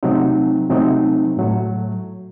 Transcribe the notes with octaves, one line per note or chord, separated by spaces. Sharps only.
C3 F#3 A3 C4 D#4
C3 F#3 A3 C4 D#4
A2 F#3 A3